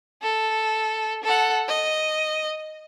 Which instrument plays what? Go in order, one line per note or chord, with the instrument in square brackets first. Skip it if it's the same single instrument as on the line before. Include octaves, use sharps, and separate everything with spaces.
[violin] A4
A4 F#5
D#5